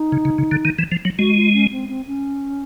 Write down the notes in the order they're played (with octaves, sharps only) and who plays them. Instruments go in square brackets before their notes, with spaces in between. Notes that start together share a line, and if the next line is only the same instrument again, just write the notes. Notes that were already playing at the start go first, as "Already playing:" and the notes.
Already playing: [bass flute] D#4
[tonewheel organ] C#3
C#3
C#3
D3
D#3
E3
F3
F#3
[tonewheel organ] G#3 [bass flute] F#4
[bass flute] F4
C#4
C4
C4
C#4